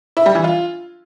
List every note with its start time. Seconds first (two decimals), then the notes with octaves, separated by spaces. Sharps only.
0.17 E4
0.26 G3
0.35 E3
0.44 F4